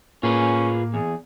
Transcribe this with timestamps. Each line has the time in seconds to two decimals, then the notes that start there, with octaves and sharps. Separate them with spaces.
0.23 A2 A#3 C#4 F4 G#4 B4
0.94 E2 G#4